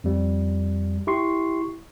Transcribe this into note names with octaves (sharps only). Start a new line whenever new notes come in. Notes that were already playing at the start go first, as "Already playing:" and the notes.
F2 G3
E4 G4 C6 C#6 C7